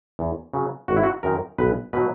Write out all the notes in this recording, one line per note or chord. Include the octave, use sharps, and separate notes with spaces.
E2
C#3 F#3
G#1 F#4
E4
F#4
F#2 D#3 A#4
B1 B4
B2 F#3 B4